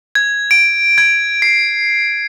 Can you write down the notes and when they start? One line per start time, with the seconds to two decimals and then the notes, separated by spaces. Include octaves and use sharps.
0.15 G#6
0.51 D7
0.98 G#6
1.42 C7